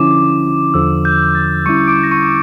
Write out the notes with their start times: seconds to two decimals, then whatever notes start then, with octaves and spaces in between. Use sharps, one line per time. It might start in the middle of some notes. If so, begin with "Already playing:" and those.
Already playing: D3 F3 C#4 E4 D6
0.74 E2 D3 F3 E6
1.05 G6
1.35 A6
1.66 D3 G3 C#4 E4 C#6 C#7
1.87 D6 D7
2.03 A#6
2.11 C#6 C#7